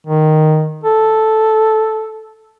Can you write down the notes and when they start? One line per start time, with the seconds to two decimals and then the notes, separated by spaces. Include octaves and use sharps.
0.07 D#3
0.84 A4